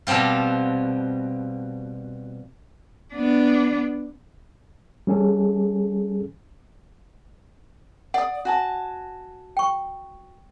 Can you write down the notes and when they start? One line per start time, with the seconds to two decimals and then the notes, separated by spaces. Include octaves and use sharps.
0.07 B2 F3 G3 C4 F4
3.14 B3 D4
5.07 G3 C#4 G#4 A4
8.14 D5 F#5 D#6
8.45 F#4 G#5 A5
9.57 G5 C#6